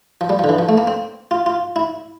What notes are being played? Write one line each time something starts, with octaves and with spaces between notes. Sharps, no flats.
F3
G3
F3
D3
E3
F3
A3
A#3
C4
F4
F4
E4